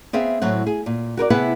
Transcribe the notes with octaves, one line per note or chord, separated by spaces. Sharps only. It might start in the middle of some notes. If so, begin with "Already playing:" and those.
B3 C4 G#4 E5 F5
A2 F#3 C4 F#5
G#4
A#2
F#4 A#4 B4 D5
C3 B3 E4 G#4 B4 F#5